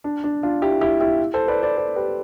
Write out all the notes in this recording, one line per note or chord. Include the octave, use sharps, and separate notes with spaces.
D4
D4
D4 F4
E4 G4
E4 G4
E4 G4
A4 C5
B4 D5
B4 D5
A4 C5
G4 B4